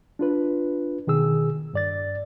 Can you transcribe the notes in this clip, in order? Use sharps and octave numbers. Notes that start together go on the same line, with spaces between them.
D4 F4 B4
B2 D#3 G#4 E6
G2 D5 A6